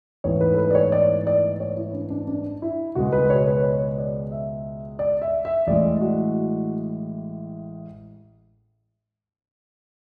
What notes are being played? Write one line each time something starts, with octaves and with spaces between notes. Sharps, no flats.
A1 G#2 E3 B3 C#5
B4
A4
B4
D5
C#5
D5
D5
C#5
E4
D4
D4
D4
E4
C#2 B2 G#3 F#4
B4
C#5
B4
C#5
D5
E5
D5
E5
E5
A1 A2 G#3 D5
F#4